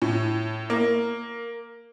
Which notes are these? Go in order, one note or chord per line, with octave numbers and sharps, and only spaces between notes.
A2
A#3